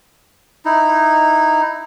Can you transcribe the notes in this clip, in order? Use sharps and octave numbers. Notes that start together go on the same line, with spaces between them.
D#4 E4